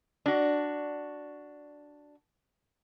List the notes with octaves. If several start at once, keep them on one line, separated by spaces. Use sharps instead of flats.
D4 F#4